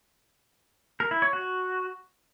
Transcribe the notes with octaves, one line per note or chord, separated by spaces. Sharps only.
A#4
E4
C#5
F#4